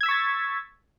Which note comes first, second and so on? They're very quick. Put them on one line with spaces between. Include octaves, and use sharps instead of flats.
G#6 E6 B6 C#6 A6